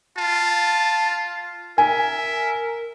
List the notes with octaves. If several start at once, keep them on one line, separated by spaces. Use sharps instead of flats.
F4 A5
A#4 E5 G#5